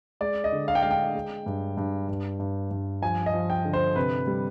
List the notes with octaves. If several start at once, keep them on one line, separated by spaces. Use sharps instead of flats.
G#3 D5
D#5
D3
F5
G5
G#3 F5
G5
G#3
G2
G2
G2
G2
G2
F3 G#5
D#5
F3
G5
D3
C5
C3 B4
G3